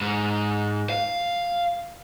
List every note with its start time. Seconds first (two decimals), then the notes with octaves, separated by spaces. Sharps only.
0.01 G#2
0.90 F5